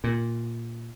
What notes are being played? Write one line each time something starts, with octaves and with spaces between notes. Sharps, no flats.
A#2